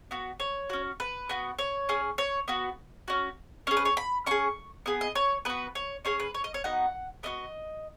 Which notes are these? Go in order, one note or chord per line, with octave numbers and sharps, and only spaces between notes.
B3 F#4
C#5
C#4 F#4
B4
B3 F#4
C#5
C#4 G#4
C#5
B3 F#4
C#4 F#4
C#4 G#4 C#5
B4
C#5
B5
C#4 G#4 C#6
B3 G#4
D#5
C#5
B3 F#4 B4
C#5
C#4 G#4 C#5
B4
C#5
D#5
C#5
B3 D#4 F#4 F#5
B3 D#4 F#4 D#5